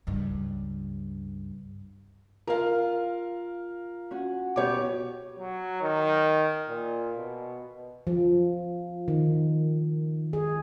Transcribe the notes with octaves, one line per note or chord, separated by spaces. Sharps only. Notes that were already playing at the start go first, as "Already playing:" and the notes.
C#2 G2
F4 A#4 F5
C#4 F#4
B2 B3 G4 C#5 D6
F#3
D#3
A#2
B2
F3
D#3
G#4